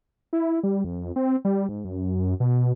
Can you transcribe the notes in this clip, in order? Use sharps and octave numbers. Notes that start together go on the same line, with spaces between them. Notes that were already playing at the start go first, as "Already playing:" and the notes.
E4
G3
F2
C4
G3
G#2
F#2
B2